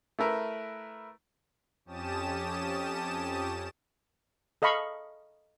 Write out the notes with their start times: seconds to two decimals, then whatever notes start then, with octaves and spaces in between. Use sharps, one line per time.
0.19 A3 E4 A#4 B4
1.85 F2 C#4 G4 A5 D#6 E7
4.62 A4 D#5 F5 B5 C#6